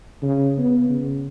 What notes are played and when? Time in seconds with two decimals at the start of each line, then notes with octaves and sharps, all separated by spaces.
0.22 C#3
0.58 B3
0.90 C#3